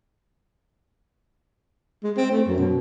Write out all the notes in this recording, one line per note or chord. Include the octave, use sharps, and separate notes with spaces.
G#3
C4
A3
F#2
B2